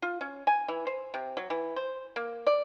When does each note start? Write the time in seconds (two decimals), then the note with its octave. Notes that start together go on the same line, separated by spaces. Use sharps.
0.02 F4
0.21 C#4
0.47 G#5
0.68 E3
0.87 C5
1.14 C3
1.37 F#3
1.50 E3
1.76 C5
2.16 A#3
2.47 D5